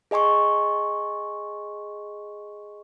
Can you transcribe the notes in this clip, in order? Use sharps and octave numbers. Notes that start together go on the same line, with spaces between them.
G#4 D#5 G#5 C6 C#6